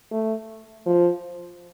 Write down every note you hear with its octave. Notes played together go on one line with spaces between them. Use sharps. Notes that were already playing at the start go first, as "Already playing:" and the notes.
A3
F3